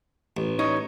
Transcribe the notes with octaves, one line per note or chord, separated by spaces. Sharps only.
A1
D#4 C#5